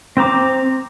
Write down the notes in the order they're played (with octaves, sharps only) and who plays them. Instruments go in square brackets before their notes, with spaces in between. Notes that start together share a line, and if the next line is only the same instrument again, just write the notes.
[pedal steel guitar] C4 C5 A#5 D6